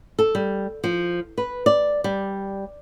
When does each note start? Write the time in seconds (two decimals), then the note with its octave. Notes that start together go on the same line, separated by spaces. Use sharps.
0.19 A4
0.35 G3
0.84 F3
1.38 B4
1.66 D5
2.04 G3